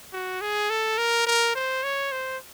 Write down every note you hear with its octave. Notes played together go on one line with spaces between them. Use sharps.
F#4
G#4
A4
A#4
A#4
C5
C#5
C5